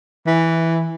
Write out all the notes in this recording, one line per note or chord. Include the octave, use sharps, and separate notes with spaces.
E3